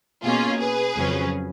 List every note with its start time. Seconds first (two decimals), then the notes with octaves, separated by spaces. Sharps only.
0.24 B2 A#3 C#4 F4 G#4
0.61 G#4 B4
0.97 F2 C#3 F#3 C#4